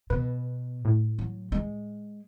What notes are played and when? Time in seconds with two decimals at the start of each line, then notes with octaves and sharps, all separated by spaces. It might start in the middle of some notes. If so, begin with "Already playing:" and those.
0.10 B2 B4
0.85 A2
1.19 F#3
1.52 G#3